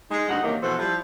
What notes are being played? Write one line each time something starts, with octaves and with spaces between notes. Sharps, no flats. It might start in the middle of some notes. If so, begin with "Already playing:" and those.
G#3 D#4
D2 G2 D#4 D#5 F#5
F#2 C3 D#3 E3 A#3 D4
B2 E3 F3 A4 C5
F3 G3 E4